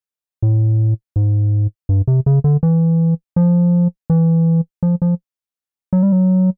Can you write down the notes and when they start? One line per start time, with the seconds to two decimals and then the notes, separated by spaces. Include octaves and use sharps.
0.42 A2
1.16 G#2
1.89 G2
2.07 C3
2.26 C#3
2.44 D3
2.63 E3
3.36 F3
4.10 E3
4.83 F3
5.02 F3
5.93 F#3
6.03 G3
6.12 F#3